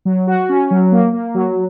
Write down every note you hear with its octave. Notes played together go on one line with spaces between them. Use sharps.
F#3
F#4
C#4
F#3
A#3
A#3
F#3